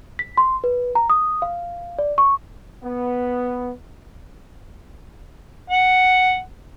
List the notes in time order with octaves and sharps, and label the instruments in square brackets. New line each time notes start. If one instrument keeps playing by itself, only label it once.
[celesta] B6
C6
B4
A#5
D#6
F5
D5
C#6
[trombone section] B3
[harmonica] F#5